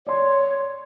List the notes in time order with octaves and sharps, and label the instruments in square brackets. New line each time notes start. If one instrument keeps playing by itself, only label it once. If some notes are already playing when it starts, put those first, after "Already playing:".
[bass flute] C#5 [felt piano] D5 C6